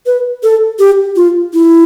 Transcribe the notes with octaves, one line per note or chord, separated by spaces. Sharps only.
B4
A4
G4
F4
E4